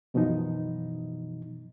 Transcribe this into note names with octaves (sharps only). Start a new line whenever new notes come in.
F#2 B2 E3 F3 D#4